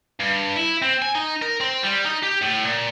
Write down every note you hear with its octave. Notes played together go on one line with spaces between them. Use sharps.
G2
E4
C4
G#5
D#4
A#4
C4
G3
D#4
G4
A2
A#2